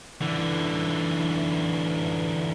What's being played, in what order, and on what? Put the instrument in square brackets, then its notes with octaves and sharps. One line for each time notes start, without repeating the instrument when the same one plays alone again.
[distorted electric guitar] D3 E3